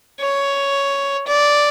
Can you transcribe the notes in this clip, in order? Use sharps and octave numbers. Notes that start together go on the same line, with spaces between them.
C#5
D5